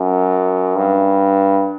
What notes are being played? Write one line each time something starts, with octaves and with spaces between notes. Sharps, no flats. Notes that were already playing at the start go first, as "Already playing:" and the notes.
Already playing: F#2
G2